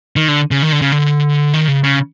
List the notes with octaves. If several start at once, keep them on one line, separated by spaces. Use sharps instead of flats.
D#3
D3
C#3
D#3
D3
C#3
D3
D#3
C#3
C#3